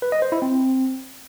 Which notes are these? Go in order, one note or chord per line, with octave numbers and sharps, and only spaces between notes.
B4
D#5
C5
E4
C4